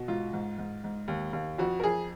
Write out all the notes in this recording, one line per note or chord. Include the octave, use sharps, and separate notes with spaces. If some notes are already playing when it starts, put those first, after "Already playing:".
Already playing: B2
G#2 F4
G#2
G#2
G#2
D#2
D#2
F2 F#4
A#4
F2 G#4